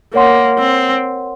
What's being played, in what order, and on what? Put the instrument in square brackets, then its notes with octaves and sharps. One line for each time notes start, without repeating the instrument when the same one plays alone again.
[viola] A#3 [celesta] A#4 C#5 F#5 C6
[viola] C4